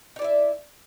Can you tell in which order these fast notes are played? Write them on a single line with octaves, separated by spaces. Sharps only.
D#4 D5 E4 E5